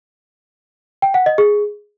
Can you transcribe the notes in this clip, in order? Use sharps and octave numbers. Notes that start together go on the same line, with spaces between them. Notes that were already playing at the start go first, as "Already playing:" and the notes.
G5
F#5
D#5
G#4